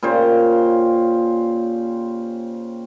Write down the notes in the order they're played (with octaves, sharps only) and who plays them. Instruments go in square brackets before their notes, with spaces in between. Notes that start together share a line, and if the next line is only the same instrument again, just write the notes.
[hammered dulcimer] A#2 C#3 G4 C5